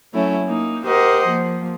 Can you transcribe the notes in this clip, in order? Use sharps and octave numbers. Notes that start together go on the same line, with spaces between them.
F#3 A3 C#4 E4
A#3 D#4
G4 A#4 C5 D#5 F#5
F3 A#3